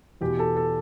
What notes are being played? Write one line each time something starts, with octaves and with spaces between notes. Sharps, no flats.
E2 B2 G4
A4
A4